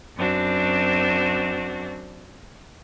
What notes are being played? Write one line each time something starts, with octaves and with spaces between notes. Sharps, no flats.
F#2 C4 D4 F#4